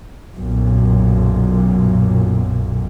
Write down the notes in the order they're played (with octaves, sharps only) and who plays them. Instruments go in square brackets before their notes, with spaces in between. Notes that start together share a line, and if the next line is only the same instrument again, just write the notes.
[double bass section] B1 F#2 A#2